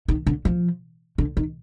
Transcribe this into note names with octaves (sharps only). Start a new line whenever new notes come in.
D#3
D3
F3
D3
D#3